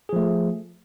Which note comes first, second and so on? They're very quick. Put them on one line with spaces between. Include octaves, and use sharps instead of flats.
G#4 F3 A3